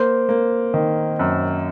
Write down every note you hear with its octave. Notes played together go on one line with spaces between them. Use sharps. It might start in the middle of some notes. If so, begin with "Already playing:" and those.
Already playing: A#3 C5
A#3
D#3
F#2